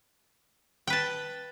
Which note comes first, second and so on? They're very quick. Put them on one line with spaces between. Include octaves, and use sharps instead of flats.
G5 B4 A5